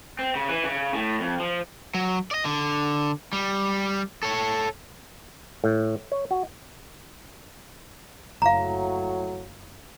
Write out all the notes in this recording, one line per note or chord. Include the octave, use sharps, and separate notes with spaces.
C4
C#3
E3
C#3
A2
F2
F3
F#3
D5 D#5
D3
G3
A4 C#5
A2
C#5
F#4
F#1 A2 F#3 F5 A#5